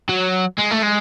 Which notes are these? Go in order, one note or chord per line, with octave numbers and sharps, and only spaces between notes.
F#3
G#3
A3
G#3